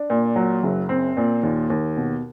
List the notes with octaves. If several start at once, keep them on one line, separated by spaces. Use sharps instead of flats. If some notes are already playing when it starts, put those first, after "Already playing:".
Already playing: D4
A#2
F#3
F#1
C4
A#2
D#2
D#2
B2